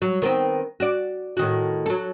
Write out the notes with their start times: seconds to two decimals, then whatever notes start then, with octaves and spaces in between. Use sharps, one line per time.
0.02 F#3
0.22 D#3 B3 C4
0.80 F#4 D5
1.37 A2 D#3 F#4
1.86 F#3 A4